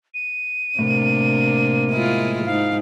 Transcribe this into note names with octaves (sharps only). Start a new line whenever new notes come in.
D#7
A2 C3 A#3 D4
G#3 E4 F4
G#2 F5